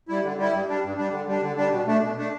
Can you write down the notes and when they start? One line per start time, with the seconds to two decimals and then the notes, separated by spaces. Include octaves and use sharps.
0.08 G3 E4
0.23 D3
0.38 G3 E4
0.52 G2
0.67 G3 D4
0.83 G2
0.97 G3 D4
1.12 D3
1.28 G3 D4
1.42 D3
1.57 G3 D4
1.72 B2
1.87 A3 D4
2.02 B2
2.17 A3 D4